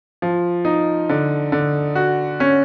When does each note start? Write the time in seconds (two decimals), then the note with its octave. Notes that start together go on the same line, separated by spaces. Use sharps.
0.22 F3
0.65 D#4
1.09 D3
1.52 D3
1.95 F#4
2.40 C#4